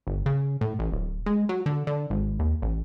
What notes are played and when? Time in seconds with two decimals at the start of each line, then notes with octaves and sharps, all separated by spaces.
0.07 G1
0.26 C#3
0.61 A2
0.79 A1
0.92 D1
1.26 G#3
1.49 F#3
1.66 D3
1.87 D3
2.10 G#1
2.39 D#2
2.62 A1